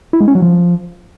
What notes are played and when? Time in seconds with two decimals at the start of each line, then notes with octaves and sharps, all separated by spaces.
0.13 E4
0.20 G#3
0.28 C#4
0.35 F#3
0.42 F3